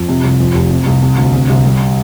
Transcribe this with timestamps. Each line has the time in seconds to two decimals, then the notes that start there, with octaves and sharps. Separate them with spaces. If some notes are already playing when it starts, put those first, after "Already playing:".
Already playing: F2
0.09 C3
0.24 C2
0.40 F2
0.54 F1
0.71 C3
0.86 C2
1.02 C3
1.17 D2
1.33 C3
1.49 C2
1.65 G3